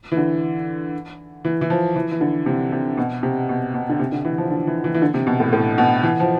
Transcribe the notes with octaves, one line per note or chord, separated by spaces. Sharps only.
E3
D3
E3
E3
F3
E3
E3
D3
C3
C3
B2
C3
B2
B2
D3
C3
D3
E3
F3
D3
E3
E3
E3
D3
C3
B2
A2
A2
B2
E3
F3